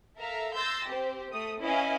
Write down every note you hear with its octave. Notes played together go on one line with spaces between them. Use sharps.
A4 A#4 E5 F5 A#5
C6 E6 G6 A6 A#6
C4 G4 C5
A3 D#6 A#6
C#4 E4 B4 D#5 F5 G#5